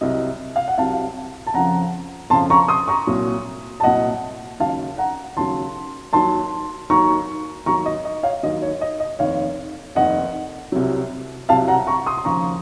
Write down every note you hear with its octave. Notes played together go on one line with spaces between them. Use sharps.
C2 C3 F#3 D#5
F5
F#5
C2 C3 F#3 F5 A5
A5
F2 C#3 F3 F#5 A#5
F2 C#3 F3 A5 C6
A#5 C#6
C6 D#6
A#5 C#6
C2 A#2 F#3
A5
C2 A#2 F#3 D#5 F#5
D#2 C#3 F#3 F5 A5
F#5 A#5
D#2 C#3 F#3 A5 C6
D#2 D#3 F#3 A5 C6
D#2 D#3 F#3 A#5 C#6
D#2 D#3 F#3 A#5 C#6
D#5
D#5
C#5 F5
D#2 D#3 F#3 D#5
C#5
D#5
D#5
F1 D#2 D#3 C#5 F5
F1 D#2 D#3 D#5 F#5
C2 C3 F#3
C2 C3 F#3 F5 A5
F#5 A#5
A#5 C#6
C6 D#6
C6
D#2 C#3 F3 A#5 C#6